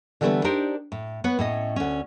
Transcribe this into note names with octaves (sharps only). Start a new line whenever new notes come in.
D3 E3 G3 A3 B3 B4
D4 D#4 G4 A#4 C5 D5
A2
B3 B4 C#5
A2 C#4 D#5
D2 C#4